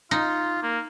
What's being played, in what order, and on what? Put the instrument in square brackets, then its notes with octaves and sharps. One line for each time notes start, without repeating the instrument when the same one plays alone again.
[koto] D#4 [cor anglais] F4
[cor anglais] A#3